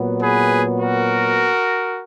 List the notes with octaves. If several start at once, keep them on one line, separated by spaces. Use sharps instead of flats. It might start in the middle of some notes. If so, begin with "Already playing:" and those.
Already playing: A#2 F#3 B3
G#4 B4
F#4 A#4